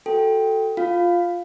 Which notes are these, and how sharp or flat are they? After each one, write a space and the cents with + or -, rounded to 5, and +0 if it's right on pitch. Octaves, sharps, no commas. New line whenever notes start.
F#4 +0 A4 +0 G5 +0
F4 +5 F5 +0